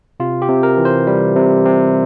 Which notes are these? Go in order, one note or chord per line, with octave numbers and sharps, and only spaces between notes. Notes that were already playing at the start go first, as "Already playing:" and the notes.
C3 F4
G4
C3
A#4
E3
C5
G3
C3
C3